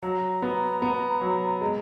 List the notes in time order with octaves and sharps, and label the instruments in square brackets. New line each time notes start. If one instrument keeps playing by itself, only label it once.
[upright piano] F#3 [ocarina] A#5
[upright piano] B3
B3
F#3
G#3